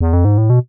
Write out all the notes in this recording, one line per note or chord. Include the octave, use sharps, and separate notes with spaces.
E2
F2
G#2
A2
B2